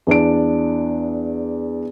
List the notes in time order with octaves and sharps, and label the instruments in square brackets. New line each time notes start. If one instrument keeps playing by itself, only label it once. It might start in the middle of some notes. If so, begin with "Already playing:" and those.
[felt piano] E2 D4 D7